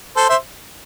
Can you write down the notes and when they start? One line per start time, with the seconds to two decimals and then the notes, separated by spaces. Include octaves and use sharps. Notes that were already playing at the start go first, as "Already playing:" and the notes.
0.17 A4 C5
0.29 C5 E5